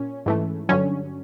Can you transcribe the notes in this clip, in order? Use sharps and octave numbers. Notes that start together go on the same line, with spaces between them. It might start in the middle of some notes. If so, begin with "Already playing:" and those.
Already playing: A#2 C#4
G#2 E3 A3
G2 D3 F#3 C#4